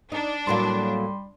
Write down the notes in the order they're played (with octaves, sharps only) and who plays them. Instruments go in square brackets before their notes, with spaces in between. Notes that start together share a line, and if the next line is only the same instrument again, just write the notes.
[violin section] D4 [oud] D#4
[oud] A2 F#3 A#3 [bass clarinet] G3 [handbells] C6